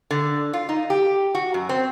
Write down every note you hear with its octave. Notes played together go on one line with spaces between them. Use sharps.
D3
F4
D#4
G4
F#4
F#2
C4